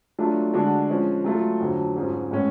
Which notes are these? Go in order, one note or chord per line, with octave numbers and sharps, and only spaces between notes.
F#3 A3 D4 F4
D3 G#3 D4 F#4
F3 G#3 C#4
F#3 A3 F4 A4
F2 D3 F#3
G#2 F#3 C#4 F4 G#4
A2 G#3 C#4